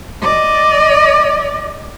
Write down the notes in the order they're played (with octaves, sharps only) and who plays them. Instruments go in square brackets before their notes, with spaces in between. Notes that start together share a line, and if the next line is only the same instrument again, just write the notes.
[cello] D5 D#5